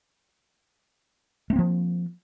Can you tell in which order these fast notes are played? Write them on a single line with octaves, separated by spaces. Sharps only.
A3 C4 A#3 F3